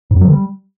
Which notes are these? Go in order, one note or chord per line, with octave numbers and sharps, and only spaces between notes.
G#2
F#2
F#3
D3
G3